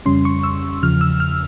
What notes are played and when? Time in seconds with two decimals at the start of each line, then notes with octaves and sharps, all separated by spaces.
0.06 F2 C#3 G3 C#4 C6
0.25 C#6
0.43 E6
0.82 E2 C#3 F3 F6
1.01 E6
1.20 F6